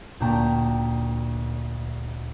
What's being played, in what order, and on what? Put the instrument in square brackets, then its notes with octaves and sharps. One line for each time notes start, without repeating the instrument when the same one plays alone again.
[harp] D2 A#2 A#3 G5 A5 A#5